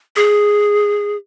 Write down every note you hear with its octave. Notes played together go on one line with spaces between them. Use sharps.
G#4